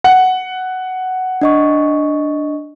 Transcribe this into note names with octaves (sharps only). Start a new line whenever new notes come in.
F#5
D4 D#5 C#6